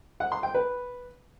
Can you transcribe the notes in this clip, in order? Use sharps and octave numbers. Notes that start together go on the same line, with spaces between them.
F#5
C6
G5
B4